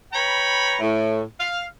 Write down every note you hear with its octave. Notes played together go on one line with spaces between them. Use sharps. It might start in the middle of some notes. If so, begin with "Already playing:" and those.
B4 C#5 G5 A#5 B5
A2
F5